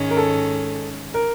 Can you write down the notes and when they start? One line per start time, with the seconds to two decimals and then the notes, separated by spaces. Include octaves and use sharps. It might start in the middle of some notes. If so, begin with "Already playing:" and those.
Already playing: G#2 D#3 G#3 C#4
0.11 A#4
0.17 A4
1.14 A#4